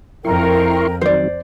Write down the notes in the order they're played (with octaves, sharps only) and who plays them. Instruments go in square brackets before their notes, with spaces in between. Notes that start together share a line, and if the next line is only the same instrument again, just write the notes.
[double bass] F2 [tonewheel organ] E4 C6 C#6 [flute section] A#4 G5
[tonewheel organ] D#3 F#3 C4 [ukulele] C5 D5